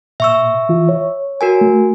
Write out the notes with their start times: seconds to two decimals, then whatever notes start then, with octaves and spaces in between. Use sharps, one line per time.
0.20 A#2 E5 C#6 E6
0.69 E3 F4
0.89 C#5
1.41 F#4 A#4 G#5
1.61 A3